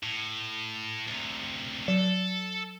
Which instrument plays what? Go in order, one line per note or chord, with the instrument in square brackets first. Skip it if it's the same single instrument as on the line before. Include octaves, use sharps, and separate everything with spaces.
[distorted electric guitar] A2
D2 C3
[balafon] F#3 [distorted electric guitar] A4